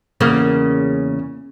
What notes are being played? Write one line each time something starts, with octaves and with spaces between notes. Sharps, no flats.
E2 C#3 A#3